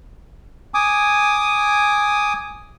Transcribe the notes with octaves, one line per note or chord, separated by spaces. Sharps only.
G#5 D6 D#6